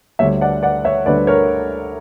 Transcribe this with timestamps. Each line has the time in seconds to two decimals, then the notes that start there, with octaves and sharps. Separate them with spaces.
0.19 D2 D3 G3 C#5 E5
0.41 D5 F#5
0.63 D5 F#5
0.85 C#5 E5
1.06 D2 D3 G3 B4 D5
1.27 A#4 C#5